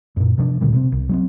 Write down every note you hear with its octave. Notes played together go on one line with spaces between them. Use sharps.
F#2 A#2
C3 F3 D4
D2 A#2 D3 G3
C3 A#3 C4
C2
F#3 B3 C4